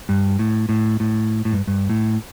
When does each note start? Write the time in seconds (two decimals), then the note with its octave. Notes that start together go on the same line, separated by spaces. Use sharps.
0.09 G2
0.39 A2
0.69 A2
1.00 A2
1.45 A2
1.53 G2
1.67 G2
1.90 A2